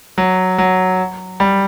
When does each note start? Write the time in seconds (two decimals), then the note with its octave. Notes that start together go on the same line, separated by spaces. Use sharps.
0.18 F#3
0.58 F#3
1.40 G3